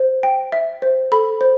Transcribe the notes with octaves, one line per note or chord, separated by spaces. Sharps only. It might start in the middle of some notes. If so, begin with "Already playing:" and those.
Already playing: C5
G5
E5
C5
A4 B5
C5